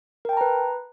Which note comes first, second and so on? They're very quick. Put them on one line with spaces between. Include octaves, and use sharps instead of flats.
A#4 G5 A5 A#5 B4